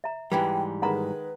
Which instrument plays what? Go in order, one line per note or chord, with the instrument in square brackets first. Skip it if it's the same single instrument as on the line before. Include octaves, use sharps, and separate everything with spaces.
[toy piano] E5 A#5
[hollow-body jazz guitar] G#2 E3 G3 [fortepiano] B4 [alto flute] G5
[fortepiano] D#3 G#3 B5 [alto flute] B4 [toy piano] F#5 A#5